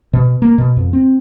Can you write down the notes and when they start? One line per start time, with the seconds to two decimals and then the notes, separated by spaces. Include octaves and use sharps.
0.13 B2
0.42 A#3
0.58 B2
0.77 F2
0.93 C4